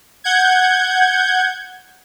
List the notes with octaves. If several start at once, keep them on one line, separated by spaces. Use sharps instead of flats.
F#5 G6 G#6